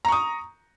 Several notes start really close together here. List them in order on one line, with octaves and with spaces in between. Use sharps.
A#5 C#6 D#6